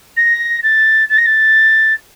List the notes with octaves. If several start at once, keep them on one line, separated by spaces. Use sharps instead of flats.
A#6
A6
A6
A#6
A6